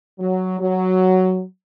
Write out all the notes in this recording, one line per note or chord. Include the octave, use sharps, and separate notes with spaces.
F#3
F#3